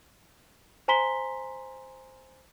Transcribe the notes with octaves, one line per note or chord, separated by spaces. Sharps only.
C5 G#5 A#5 C6 B6 G7